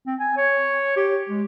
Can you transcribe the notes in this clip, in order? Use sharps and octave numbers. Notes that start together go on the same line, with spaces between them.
C4
G#5
C#5
G4
G#3